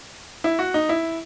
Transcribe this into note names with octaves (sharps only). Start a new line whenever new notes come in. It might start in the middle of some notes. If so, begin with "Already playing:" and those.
E4
F#4
D#4
E4